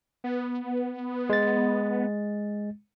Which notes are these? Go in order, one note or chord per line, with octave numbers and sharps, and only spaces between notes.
B3
G#3 A6